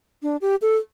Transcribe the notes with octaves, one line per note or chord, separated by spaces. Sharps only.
D4
G4
A4